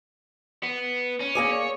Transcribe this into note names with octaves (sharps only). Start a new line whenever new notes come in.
B3
C#4
A#3 G#4 D5
C#5